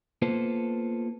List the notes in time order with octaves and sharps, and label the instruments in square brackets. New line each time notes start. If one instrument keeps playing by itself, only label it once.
[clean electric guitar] A#3 B3 F4 A4 B4 C5